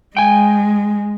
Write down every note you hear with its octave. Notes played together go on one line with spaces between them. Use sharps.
G#3 G5 G#5